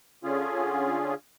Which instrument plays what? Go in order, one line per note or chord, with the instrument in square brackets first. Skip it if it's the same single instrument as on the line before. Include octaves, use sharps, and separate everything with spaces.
[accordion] D3 C#4 F4 G#4